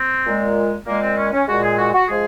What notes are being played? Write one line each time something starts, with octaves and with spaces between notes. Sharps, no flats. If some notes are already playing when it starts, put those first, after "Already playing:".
Already playing: C4
A#2 G#3
A#2 G#3 A#3
C4
C#4
C#4
A#2 G#3 F#4
G#4
F#4
F#4
F3 G#3 G#4